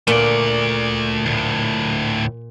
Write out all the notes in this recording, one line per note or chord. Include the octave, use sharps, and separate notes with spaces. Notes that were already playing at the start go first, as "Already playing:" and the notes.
A#2 A3 D5
D2 A2